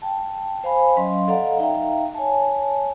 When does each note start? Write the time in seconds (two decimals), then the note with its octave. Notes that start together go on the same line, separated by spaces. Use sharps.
0.02 G5 A5
0.64 C5 F5 G#5 B5
0.97 F#3 C#4 D#5 F5 C6
1.28 A4 D5 D#5 F5 F#5 A#5
1.59 D#4 E5 F5 G5 A#5
2.14 C#5 G#5 A5